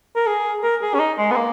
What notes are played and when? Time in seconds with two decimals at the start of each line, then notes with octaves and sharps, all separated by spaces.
0.16 A#4
0.27 G#4
0.63 A#4
0.82 G#4
0.94 C#4
0.99 D#4
1.18 G#3
1.31 B3
1.36 A#3